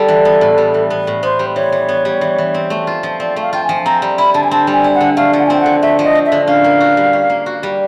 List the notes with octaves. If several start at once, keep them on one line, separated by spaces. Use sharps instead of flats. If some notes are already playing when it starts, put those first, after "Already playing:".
Already playing: G3 A4
E3
B3
A2
G3
E3
B3
A2
B3 C5
G3
E3 C#5
E3
B3
G3
E3
E3
C4
A3
F4
F3
C4 D5
A3
F5
F4 G5
G#5
F3
C4 A#5
G3
E4 B5
D3 A5
G#5
C4 A5
G3
G#5
E4
F#5
D3
A3 F5
F3
F#5
G#5
C4 G5
D3 F#5
A3 E5
F3
D#5
C4
E5
D3
C#4 F5
A#3
F#4
G3
C#4
A#3
F#4
G3